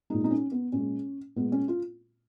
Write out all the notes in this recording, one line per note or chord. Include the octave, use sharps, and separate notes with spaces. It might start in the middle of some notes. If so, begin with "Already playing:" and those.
A#2 G#3 D#4
D#4
C#4
B3
A#2 G#3 C#4
A#2 G#3 B3
C#4
F4